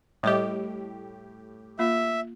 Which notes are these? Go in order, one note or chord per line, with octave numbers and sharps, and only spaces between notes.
A2 G3 G4 D#5
A#3 F4 E5